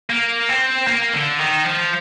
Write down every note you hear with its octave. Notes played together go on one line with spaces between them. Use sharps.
A#3
C4
A#3
D3
D#3
F3